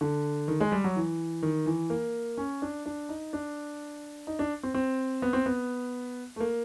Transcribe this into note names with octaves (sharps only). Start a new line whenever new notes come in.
D3
D#3
G#3
G3
F#3
E3
D#3
E3
A#3
C#4
D4
D4
D#4
D4
D#4
D4
C4
C4
B3
C4
B3
A3
A#3